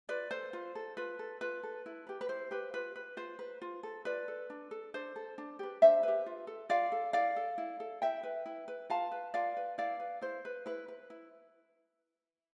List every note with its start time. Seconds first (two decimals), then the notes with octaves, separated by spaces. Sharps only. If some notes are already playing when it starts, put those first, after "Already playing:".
0.09 F4 B4 D5
0.31 A4 C5
0.53 F4
0.75 A4
0.97 F4 B4
1.19 A4
1.41 F4 B4
1.63 A4
1.86 E4
2.07 G4 B4
2.21 B4
2.29 E4 C5
2.51 G4 B4
2.74 F4 B4
2.96 B4
3.17 F4 C5
3.39 B4
3.62 F4
3.83 A4
4.05 F4 B4 D5
4.28 A4
4.50 D4
4.71 A4
4.94 D4 C5
5.16 A4
5.38 D4
5.59 G4 B4
5.82 D4 C5 E5
6.03 G4 B4
6.26 F4
6.47 A4
6.69 F4 D5 F5
6.92 A4
7.13 E4 D5 F5
7.36 A4
7.58 E4
7.80 A4
8.02 E4 E5 G5
8.23 B4
8.46 E4
8.68 B4
8.90 F4 F5 A5
9.12 B4
9.34 F4 D5 F5
9.57 B4
9.78 E4 D5 F5
10.00 B4
10.21 E4 C5
10.45 B4
10.66 E4 B4
10.88 B4
11.10 E4